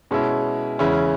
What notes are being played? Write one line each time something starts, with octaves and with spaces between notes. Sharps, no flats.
B2 G#3 C#4 E4
E2 C#3 G#3 C#4 E4